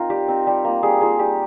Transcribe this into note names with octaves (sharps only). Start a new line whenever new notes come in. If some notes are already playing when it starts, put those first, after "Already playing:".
Already playing: C4 D#4 F4 A#4
G3 G4
C4 D#4
G3
A#3 F4
G3 G#4
A#3 F4 G#4
G3 G4